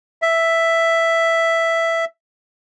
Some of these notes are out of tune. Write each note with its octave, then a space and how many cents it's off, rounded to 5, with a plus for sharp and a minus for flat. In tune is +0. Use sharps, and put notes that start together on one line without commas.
E5 +5